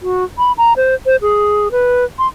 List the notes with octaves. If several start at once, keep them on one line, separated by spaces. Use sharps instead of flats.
F#4
B5
A#5
C5
C5
G#4
B4
C6